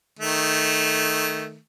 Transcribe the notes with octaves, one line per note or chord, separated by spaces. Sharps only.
D#3 A3